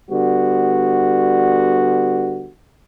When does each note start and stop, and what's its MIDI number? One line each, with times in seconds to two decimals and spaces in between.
0.11 2.49 50
0.11 2.49 55
0.11 2.49 59
0.11 2.49 66